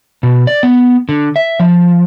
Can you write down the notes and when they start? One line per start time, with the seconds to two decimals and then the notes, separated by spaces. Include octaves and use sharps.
0.23 B2
0.47 D5
0.63 B3
1.09 D3
1.36 E5
1.60 F3